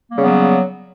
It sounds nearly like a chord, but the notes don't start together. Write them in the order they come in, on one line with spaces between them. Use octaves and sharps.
A#3 G3 C#3 B3 F#3